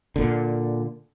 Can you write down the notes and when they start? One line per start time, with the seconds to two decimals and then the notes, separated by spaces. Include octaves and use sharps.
0.16 A#2 D3